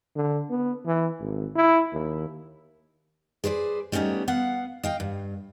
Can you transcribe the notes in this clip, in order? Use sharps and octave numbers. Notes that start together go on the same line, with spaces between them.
D3
B3
E3
G#1
E4
D#2
G#4 B4 C5 D5
G3 A3 B3 C#4 D#4
B3 F5 F#5
D#5 F5 G5
G2